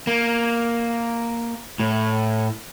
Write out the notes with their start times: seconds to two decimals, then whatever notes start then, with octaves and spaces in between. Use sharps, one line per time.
0.07 A#3
1.79 A2